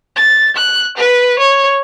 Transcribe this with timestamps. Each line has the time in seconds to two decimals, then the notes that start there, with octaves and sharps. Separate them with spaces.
0.16 A6
0.56 F#6
0.97 B4
1.39 C#5